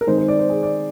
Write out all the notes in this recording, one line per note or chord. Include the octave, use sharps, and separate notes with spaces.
A#4
D#3 G#3 C4 D#4 C5
C5
D5
C5
G#4
D5